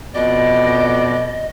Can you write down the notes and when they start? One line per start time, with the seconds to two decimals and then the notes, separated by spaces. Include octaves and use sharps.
0.15 F2 B2 D5 D#5